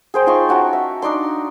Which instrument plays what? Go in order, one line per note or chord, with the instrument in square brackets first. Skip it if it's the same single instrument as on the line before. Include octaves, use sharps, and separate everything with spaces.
[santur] G#4 C5 G5
D#4 F4 C6 C#6
C#4 F#4 A5 A#5
E5
D4 D#4 D5 C6